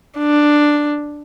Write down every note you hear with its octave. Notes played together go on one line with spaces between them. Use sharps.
D4